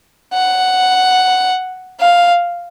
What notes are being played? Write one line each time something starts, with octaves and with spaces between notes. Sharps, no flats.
F#5
F5